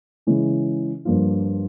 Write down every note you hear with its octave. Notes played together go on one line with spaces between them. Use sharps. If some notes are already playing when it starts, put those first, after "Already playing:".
C#3 E3 G#3 C#4 E4
G2 F3 A#3 F4